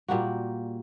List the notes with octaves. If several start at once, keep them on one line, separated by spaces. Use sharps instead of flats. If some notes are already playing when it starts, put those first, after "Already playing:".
A#2 G3 A#3 F#4